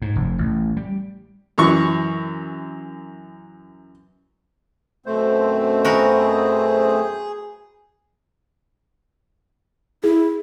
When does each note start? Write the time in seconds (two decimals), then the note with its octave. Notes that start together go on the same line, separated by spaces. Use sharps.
0.02 G#2
0.16 F1
0.38 A1
0.77 G3
1.58 F#2 E3 C#6
5.06 F#2 B2 A3 C4 C5
5.85 F#4 G#4 A#4 B4
10.04 E4 G#4